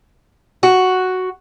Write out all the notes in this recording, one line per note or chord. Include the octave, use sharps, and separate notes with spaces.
F#4